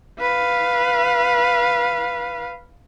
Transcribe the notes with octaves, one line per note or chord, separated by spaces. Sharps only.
B4 F5